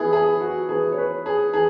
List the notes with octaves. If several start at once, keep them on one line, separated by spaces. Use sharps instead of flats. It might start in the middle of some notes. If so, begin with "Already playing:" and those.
Already playing: E3 B3 E4 G#4
G#4
F#4
E3 B3 E4 G#4
C#5
B4
G#4
E3 G#4